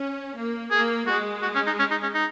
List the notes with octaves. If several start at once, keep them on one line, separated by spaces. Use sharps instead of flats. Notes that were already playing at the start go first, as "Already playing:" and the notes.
Already playing: C#4
A#3
A#3 G#4
G#3 F#4
F#4
C#4
D#4
C#4
D#4
C#4
D#4